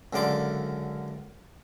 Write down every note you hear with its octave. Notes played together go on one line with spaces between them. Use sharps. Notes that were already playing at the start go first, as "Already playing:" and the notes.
C#2 F#2 D3 D5 C6 D6